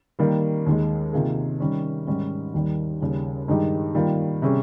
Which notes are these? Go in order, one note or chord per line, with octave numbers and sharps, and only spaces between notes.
D#3 G3 A#3
D#2 D#3 G#3
C3 D#3 A#3 F4 G#4
D#3 G3 C#4
G#2 D#3 G3 C#4
D#2 D#3 G3
D#2 C#3 G3
G2 D#3 G#3 D#4 G4
D#3 G3 A#3 F4
C3 G3 C#4 G#4